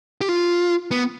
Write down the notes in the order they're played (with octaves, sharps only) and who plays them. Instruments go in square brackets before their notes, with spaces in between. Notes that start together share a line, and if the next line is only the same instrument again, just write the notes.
[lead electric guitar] G4
F4
B3